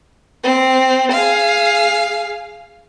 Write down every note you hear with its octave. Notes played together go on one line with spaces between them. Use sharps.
C4
G#4 F5